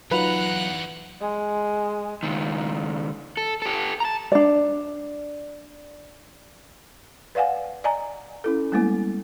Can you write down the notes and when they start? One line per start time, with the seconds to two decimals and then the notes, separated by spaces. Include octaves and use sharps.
0.11 E2 F#3 D#4 F4 B4 F#5 A#5 F#6
1.21 G#3
2.23 C#2 D#3
3.37 A4
3.62 G4 A4
4.00 A5 A#5
4.32 D4 D5
7.35 B4 D5 F5 F#5 G#5
7.84 D5 D#5 G#5 A#5
8.44 C#4 E4 A4
8.72 G3 G#3 A#3 B3 E4